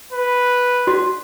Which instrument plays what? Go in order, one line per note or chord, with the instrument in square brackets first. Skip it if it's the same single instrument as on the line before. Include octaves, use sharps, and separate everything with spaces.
[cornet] B4
[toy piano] F#4